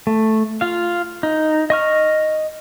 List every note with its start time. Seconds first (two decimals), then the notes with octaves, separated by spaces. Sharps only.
0.07 A3
0.61 F4 F5
1.23 D#4
1.70 D#5 C#6 F6